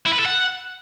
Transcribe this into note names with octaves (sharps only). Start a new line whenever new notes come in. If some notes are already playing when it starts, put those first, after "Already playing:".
E4
B4
A4
F#5